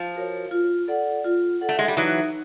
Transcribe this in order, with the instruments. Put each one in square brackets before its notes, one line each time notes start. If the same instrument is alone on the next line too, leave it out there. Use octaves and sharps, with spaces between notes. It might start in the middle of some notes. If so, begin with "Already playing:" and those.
Already playing: [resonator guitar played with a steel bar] F3
[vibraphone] F#4 A#4 C#5
F4
A4 D5 F#5
F4
A4 D5 F#5
[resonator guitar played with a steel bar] A3
G#3
G3
[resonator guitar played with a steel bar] E3 F#3 [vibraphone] D#4